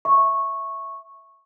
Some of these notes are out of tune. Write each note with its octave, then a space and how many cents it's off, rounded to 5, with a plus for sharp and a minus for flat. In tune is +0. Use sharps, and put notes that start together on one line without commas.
E5 +0 C#6 -10